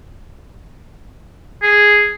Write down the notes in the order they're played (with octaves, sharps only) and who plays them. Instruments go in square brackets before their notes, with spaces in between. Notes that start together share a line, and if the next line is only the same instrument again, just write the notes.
[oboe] G#4